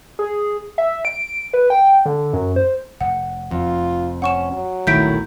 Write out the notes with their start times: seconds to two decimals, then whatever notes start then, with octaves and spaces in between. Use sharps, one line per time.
0.19 G#4
0.78 E5
1.05 D7
1.53 B4
1.70 G5
2.06 D3
2.33 F#2
2.56 C5
3.01 F1 F#5
3.51 F2 F4
4.22 C#4 F#5 C#6 E7
4.53 F#3
4.87 D#1 B1 D#3 A3 E4 G6 B6 D7